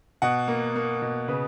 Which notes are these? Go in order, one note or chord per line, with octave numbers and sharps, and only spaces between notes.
B2 F#5
A#3
A#3
B2
C#3 B4